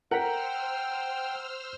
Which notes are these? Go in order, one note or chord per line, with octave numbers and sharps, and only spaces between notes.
A#4 C5 F#5 G5 A#5 E6 F6 B6